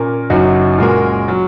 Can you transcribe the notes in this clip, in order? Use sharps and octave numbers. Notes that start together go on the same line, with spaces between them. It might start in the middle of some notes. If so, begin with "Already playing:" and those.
Already playing: A#2 A#3 C#4 A#4
F#1 F#2 F#3 D#4 F#4
A#2 G#3 F#4 A#4
F#3